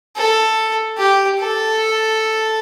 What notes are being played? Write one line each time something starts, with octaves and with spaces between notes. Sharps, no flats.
A4
G4
A4